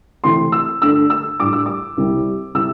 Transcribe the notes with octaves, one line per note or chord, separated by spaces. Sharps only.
C3 E3 A3 C4 E4 C6
E6
G2 D3 A3 D4 E6
E6
A2 G3 D4 D6
E6
D6
C2 C3 G3
C3 G3 E4 E6